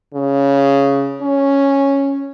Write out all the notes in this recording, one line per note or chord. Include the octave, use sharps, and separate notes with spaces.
C#3
C#4